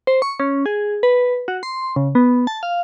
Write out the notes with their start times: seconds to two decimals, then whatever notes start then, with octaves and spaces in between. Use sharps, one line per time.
0.07 C5
0.22 C#6
0.40 C#4
0.66 G#4
1.03 B4
1.48 F#4
1.63 C6
1.96 C#3
2.15 B3
2.47 A5
2.63 F5